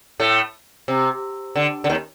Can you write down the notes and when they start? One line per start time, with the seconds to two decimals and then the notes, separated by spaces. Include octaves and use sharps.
0.20 A2 A3
0.88 C3
1.56 D3
1.84 D3
1.89 D#2 D#3